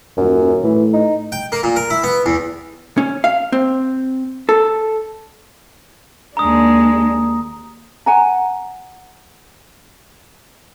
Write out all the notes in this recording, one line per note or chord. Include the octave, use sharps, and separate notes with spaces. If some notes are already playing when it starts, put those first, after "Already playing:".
D#1 F#2
A2 E3
D#4
G5
A#3
A#2
A#4
E4
B3
E2
C#4
F5
C4
A4
D#2 G#3 D4 A#5 D#6
F#5 G#5 A#5